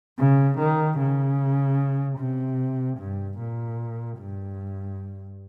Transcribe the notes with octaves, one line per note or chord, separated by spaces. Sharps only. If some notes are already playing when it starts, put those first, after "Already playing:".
C#3
D#3
C#3
C3
G2
A#2
G2